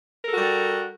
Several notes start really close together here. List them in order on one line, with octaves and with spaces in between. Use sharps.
A#4 A4 F#4 G3